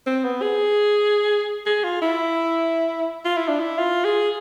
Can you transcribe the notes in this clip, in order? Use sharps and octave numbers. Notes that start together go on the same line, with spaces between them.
C4
B3
G#4
G#4
F4
E4
F4
E4
D4
E4
F4
G#4